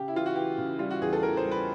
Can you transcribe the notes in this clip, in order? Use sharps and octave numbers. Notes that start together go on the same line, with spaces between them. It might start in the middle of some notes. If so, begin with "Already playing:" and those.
Already playing: C#3 G4
E4
E3 F4
F#4
E3 G4
C#3
G3 F4
F#4
E2 G#4
A4
E3 A#4
C5
G3
B4